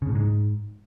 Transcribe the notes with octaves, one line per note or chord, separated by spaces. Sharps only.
C#3
A2
G#2